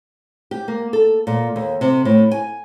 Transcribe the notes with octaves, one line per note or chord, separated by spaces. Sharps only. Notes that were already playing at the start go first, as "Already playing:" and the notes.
G4
A#3
A4
A#2
D#2
C3
A2
G#5